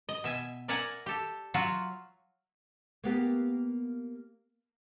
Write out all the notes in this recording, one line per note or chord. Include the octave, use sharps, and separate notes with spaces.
D#5
B2 E5 G#5
A#4 D5 E5 F#5 G#5 A#5
G4 A4
F#3 F4 F#4 E5
A#3 B3 G4